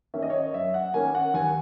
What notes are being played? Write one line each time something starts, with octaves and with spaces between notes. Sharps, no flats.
D#3 A#3 C#4 E5
D#5
C#5
D#5
F#2 E5
F#5
D#3 A#3 C#4 G#5
F#5
D#2 G#5